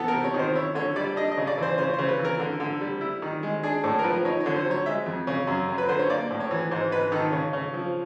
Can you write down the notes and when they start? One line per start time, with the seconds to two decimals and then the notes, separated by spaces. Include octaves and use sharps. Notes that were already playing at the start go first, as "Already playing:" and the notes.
Already playing: E3 B3 A4
0.08 A#4
0.14 C3
0.24 C#5
0.34 D#3
0.39 C5
0.55 E4 C#5
0.75 D3 C#5
0.96 G3 D5
1.16 D4 D#5
1.32 D#5
1.37 C#3
1.47 D5
1.58 E3 C5
1.78 C#3 C5
1.94 C#3 C5
2.09 B4
2.19 E3
2.25 A#4
2.40 D3
2.60 D3
2.81 G3
3.01 E4
3.22 D#3
3.43 G#3
3.63 D4 G#4
3.83 A2 A4
3.99 A#4
4.04 F3 B4
4.25 D#4 C#5
4.40 C#5
4.46 D3
4.56 C5
4.66 F#3 C#5
4.86 G#3 E5
5.06 F2
5.27 C#3
5.47 F#2
5.69 F#2
5.78 B4
5.89 D3 C5
5.99 C#5
6.10 A#3 D5
6.31 A2
6.40 C#5
6.51 E3
6.71 G#2 C5
6.91 G#2 B4
7.12 D#3 A4
7.32 C#3
7.53 C#3
7.74 F3